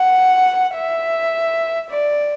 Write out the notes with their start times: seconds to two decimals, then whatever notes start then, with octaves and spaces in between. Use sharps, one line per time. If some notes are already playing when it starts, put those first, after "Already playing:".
Already playing: F#5
0.75 E5
1.90 D5